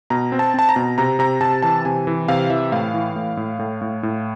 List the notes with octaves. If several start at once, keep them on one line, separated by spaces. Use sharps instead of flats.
B2 A#5
C4
A5
C4 A5
A#5
B2
C3 A#5
C3 A#5
C3 A5
E3 A5
C3 G#5
E3
C3 F5
E3 E5
A2 F5
E3
A2
A2
A2
A2
A2